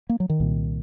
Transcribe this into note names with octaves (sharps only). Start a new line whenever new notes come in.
A#3
F#3
D#3
C2 A#2